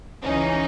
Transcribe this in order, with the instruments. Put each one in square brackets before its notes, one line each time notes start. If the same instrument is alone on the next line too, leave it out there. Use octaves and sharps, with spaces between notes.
[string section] C#2 C#3 E3 C#4 D#4